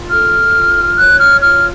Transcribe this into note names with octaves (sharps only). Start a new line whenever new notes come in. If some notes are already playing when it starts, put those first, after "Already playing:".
Already playing: F4
A4 F6
F4
C#5 F#6
F6
F4 F6